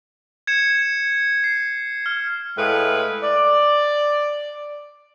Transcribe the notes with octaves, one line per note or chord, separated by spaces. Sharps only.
G#6 C#7 E7
C7
F6
A2 G#3 A3 B4 F5 G5
D5